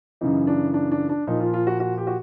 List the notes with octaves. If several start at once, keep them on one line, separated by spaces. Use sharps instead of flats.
F#2 C#3 E3 D#4
D4
D4
D4
D4
A#2 F3 D#4
F4
F4
F#4
F#4
G4
F#4